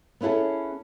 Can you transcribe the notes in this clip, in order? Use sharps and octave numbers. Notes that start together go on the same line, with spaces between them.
B3 C#4 E4 G#4 A4